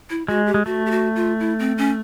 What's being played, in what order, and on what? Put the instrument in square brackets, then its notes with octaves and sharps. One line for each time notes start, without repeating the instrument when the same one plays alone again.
[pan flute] E4
[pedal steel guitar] G#3 [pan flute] F#4
[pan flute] G4
[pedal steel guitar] G#3
[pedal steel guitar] A3 [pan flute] F#4
[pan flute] G4
F#4
F4
E4
C4
C#4